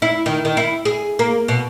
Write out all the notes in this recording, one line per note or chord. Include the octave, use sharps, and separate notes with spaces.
E4
D#3
D#3
E4
G#4
A#3
B2